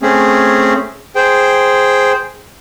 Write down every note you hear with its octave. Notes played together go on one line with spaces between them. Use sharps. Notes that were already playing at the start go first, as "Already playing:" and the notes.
A3 C4 C#4 G#4
G#4 C5 G5